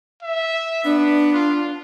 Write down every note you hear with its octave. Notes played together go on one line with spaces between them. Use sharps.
E5
B3 D4
F4